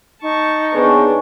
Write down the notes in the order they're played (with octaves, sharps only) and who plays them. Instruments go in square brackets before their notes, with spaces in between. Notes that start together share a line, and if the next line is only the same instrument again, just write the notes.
[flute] D#4 [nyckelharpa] A5 C#6
[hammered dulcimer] D#3 C#4 C#5 [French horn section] B3 G#4 B4 [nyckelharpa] D4